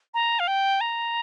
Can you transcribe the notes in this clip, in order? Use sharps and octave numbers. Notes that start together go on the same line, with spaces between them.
A#5
F5
G5
A#5